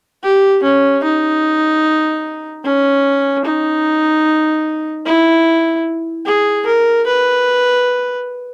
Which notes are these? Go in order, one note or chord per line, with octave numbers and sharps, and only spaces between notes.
G4
C#4
D#4
C#4
D#4
E4
G#4
A#4
B4